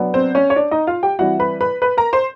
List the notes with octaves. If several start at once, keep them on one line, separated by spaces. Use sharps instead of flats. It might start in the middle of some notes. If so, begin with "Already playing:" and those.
Already playing: F#3 B3 D4
C4 C5
C#4 C#5
C#5
D4 D5
D#4 D#5
F4 F5
G4 G5
E3 G3 C4 E4 F#4 F#5
B4 B5
B4 B5
B4 B5
A#4 A#5
C5 C6